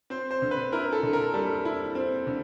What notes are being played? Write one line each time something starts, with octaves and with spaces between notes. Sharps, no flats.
C4 C5
C5
D3
B4
E4 A#4
A4
D3
A#4
G3 A4
E4
C4
D3